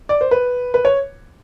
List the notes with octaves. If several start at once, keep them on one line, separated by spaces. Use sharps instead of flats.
D5
C5
B4
B4
C#5